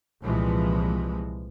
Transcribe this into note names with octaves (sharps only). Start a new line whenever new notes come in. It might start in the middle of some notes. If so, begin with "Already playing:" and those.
C2 A#2 E3 F3 G#3